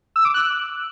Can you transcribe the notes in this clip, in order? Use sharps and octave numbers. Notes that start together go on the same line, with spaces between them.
E6
D6
F#6